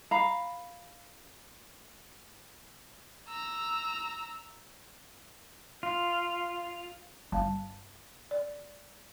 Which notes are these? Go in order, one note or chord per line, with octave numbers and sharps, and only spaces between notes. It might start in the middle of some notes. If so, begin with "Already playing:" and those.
F5 A#5 B5
A#5 E6
F4
G1 F5 A5
D5